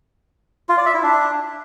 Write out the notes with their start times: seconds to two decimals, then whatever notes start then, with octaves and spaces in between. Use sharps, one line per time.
0.69 F4
0.77 D5
0.86 E5
0.95 E4
1.03 D4